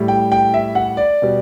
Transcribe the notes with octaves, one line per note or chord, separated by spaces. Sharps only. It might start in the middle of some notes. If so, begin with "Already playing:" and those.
Already playing: A2 G3
G5
G5
E5
F#5
D5
B2 G3